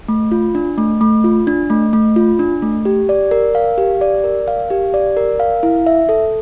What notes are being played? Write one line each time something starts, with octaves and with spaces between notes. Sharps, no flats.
A3
F4
D4
A3
A3
F4
D4
A3
A3
F4
D4
A3
G4
D5
A#4
F5
G4
D5
A#4
F5
G4
D5
A#4
F5
E4
E5
A4